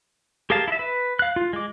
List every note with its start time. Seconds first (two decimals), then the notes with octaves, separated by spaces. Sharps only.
0.50 G4 G#4 A#4 F5 A5
0.68 E4 E5
0.79 B4
1.19 F5 F#6
1.36 F4
1.53 G#3 D6